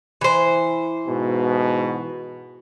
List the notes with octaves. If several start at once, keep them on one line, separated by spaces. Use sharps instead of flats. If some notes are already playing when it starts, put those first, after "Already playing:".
E3 C5
G#2 B2